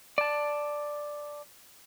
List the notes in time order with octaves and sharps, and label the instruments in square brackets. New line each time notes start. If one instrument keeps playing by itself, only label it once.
[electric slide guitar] D5 A5